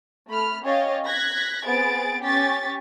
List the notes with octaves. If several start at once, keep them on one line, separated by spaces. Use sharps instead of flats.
A3 B5 F6
C#4 G4 C#5 D#5 F5 A6
F#6 G#6 A#6 B6
B3 C4 G#4 A6 D7
C#4 G4 C#6 A6 B6